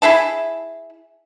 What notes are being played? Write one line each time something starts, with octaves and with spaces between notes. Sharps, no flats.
E4 G#4 E5 A5